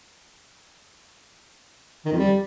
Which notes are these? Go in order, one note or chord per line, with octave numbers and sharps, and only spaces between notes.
D#3
F2
G3